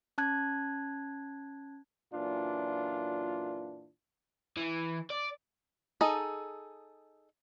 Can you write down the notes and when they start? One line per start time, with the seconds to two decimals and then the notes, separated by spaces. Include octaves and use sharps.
0.18 C#4 A5 F#6 G#6
2.12 F#2 A#2 E3 D4 F4
4.57 E3
5.10 D5
6.01 D#4 G#4 A4 D#5